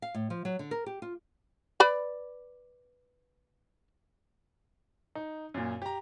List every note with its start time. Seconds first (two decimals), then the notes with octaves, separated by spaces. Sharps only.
0.02 F5
0.15 A2
0.30 F3
0.45 F#3
0.59 D3
0.71 A#4
0.86 G4
1.02 F4
1.80 B4 D5 B5
5.15 D#4
5.54 F#2 A#2
5.82 G4 A#5